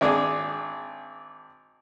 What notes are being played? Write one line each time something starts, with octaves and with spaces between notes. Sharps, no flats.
G#1 D4 G#4